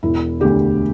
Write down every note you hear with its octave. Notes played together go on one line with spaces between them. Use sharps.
E1 E4
D2 D3 G4